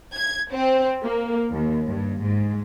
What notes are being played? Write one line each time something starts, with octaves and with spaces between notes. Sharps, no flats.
G#6
C4
A#3
D#2
G2
G#2